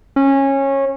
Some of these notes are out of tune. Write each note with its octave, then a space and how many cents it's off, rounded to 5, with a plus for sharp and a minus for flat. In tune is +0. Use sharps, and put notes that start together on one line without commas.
C#4 -20